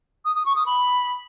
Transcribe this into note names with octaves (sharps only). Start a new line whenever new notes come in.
D#6
D#6
C#6
D#6
B5